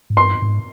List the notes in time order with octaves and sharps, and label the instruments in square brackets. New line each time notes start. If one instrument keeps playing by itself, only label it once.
[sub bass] G#2
[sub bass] G2 [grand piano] C6
[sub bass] G#2